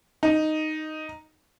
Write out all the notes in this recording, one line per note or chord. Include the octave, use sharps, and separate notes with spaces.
D#4